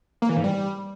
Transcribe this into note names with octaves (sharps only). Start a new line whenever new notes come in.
A#3
E3
G#2
G3